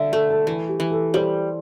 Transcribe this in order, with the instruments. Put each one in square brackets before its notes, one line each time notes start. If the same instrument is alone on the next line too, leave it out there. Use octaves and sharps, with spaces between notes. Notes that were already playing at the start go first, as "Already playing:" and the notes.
Already playing: [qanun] D3 [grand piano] E5
[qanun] A3 [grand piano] A4
[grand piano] A4
[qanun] E3 [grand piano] A4
[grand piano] G4
[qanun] E3
[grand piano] A4
[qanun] G3 [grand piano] C5